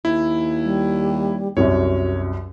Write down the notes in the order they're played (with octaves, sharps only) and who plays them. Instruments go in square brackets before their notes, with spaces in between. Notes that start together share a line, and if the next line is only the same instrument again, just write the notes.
[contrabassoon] D#2 [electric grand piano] E4
[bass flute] G3
[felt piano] C2 F#2 [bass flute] F#4 [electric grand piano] C#5